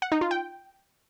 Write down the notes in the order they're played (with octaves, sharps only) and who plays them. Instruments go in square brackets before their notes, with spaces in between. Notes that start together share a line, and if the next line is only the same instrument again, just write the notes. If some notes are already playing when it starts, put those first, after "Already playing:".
[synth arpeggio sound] F#5
D#4
F4
G5